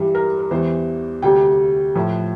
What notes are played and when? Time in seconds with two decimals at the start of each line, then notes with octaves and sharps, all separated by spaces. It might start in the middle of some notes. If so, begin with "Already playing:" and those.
Already playing: G2 E3 G3
0.15 A#4
0.39 A#4
0.51 E2 E3 G3 C5
1.22 D2 C3 G3 G5
1.95 A2 F3